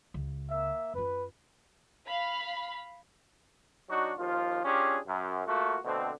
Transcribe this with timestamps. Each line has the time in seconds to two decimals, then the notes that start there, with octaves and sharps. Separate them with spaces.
0.14 C#2
0.49 A#3 E5
0.94 F#2 F4 B4
2.05 F5 B5
3.89 F#3 D4 D#4 F#4
4.18 D#2 F3 F4
4.65 C#4 D4 F4 G4 G#4
5.07 F#2
5.46 A3 A#3 F4 F#4
5.85 B2 D3 A3 C4